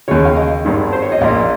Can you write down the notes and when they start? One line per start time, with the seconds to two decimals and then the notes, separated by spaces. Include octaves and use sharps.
0.08 D#2 C#3 C#5
0.25 F5
0.36 D#5
0.65 G#1 G2 D#3
0.93 C5
1.02 C#5
1.12 D#5
1.21 A#1 A#2 F5